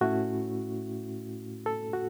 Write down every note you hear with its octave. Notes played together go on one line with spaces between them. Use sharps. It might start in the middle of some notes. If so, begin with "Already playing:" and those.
A2 A3 C#4 E4 F#4
A4
F#4